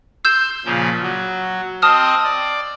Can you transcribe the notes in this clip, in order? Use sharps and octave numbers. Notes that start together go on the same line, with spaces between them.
C6 E6 G6 E7
A#2 C#3 F3
F#3
C4 D#5 A5 D#6 F6
D5